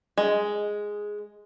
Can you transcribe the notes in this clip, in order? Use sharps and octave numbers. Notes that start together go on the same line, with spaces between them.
G#3